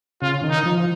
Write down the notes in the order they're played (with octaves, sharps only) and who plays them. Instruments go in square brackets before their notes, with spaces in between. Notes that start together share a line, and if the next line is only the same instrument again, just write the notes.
[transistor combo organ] C#3 [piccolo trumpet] F4
[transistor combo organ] D#3
[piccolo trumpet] D#4
[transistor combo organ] F3